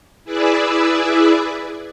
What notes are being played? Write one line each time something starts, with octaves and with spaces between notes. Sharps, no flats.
E4 G#4 B4 D5 E5